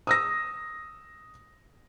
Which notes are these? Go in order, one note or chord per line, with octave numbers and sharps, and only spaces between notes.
D#6 E6 A#6